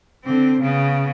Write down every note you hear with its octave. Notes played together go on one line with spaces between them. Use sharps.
D3 C4
C#3 B3